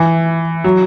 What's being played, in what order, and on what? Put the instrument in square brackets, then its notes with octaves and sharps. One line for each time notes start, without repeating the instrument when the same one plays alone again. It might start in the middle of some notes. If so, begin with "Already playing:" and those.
Already playing: [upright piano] E3
F#3